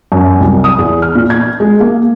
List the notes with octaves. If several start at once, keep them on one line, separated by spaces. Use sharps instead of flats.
F#2
C2
D#6
E2
F6
A#2
G#6
G#3
A#3